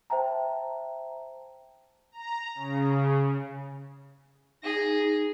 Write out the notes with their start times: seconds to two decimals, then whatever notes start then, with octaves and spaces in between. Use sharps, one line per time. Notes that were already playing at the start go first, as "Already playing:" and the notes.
0.10 C5 E5 G5 A5 A#5
2.12 A#5
2.55 C#3
4.63 D#4 G#4 A#6